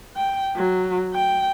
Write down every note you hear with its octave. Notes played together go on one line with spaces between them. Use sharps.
G5
F#3
G5